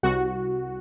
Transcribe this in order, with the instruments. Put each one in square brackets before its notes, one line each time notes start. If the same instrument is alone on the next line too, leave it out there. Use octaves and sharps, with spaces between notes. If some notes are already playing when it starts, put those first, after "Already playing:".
[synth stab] C2 F#4